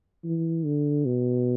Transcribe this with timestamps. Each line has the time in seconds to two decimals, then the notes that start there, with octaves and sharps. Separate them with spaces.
0.24 E3
0.65 D3
1.06 B2